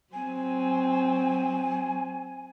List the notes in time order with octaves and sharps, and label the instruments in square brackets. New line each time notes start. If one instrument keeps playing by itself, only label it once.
[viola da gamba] F#3 C4 [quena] G#5